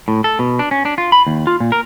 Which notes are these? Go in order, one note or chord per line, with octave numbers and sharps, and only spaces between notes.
A2
A4
B2
D4
C#4
D4
F4
B5
D#2
F4
A#2
A#4